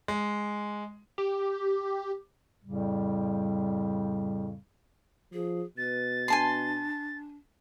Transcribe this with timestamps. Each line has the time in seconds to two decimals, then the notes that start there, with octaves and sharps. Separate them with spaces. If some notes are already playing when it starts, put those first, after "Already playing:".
0.08 G#3
1.18 G4
2.65 F2 A2 C#3 G3
5.33 F3 G#4
5.78 B2 B4 A6
6.28 D4 G#5 A5 C6